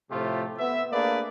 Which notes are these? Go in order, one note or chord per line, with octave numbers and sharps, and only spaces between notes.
A2 C3 F3 A3 F4 G4
B3 E5
A3 A#3 D4 G#4 B4 D5